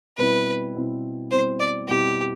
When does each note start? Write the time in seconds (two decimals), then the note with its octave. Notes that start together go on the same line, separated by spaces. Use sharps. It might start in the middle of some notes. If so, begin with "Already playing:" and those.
0.17 B2 G3 C4 E4 B4
0.75 B2 G3 C4 E4
1.31 B2 G3 C4 E4 C5
1.59 D5
1.88 B2 G3 C4 E4 G4